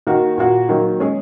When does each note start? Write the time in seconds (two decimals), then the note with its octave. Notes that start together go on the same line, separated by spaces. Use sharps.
0.07 D#3 A#3 F#4 A#4
0.38 A#2 A#3 F#4
0.69 D#3 F#3 A#3
1.00 G#3 C#4 G#4